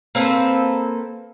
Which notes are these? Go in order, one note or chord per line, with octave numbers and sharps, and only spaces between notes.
A#3 C4 A4 B4